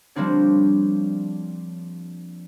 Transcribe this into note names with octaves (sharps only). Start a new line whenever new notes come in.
F3 G3 A#3 C4 D4 C#5